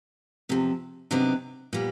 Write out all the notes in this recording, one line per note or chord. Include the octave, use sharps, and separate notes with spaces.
E2 C3 F3
C3 D#3 F#3 B3 D4
A#2 G3 B3